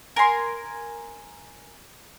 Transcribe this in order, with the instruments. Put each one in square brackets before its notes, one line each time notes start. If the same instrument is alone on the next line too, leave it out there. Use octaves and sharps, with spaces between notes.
[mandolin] A#4 G#5 C6